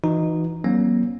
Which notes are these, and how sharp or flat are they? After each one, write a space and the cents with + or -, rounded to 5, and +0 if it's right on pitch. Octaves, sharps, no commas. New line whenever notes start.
E3 +0 D#4 -5 F#4 -30
F#3 +35 A#3 +30 C#4 -40